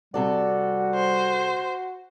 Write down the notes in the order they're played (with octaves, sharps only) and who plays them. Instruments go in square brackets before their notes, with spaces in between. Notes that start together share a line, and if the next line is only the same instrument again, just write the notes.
[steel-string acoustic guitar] C3 A4 D5 [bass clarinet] G3 [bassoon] F#4
[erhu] C5